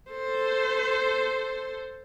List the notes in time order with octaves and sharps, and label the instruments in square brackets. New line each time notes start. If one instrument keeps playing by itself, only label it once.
[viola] A4 C5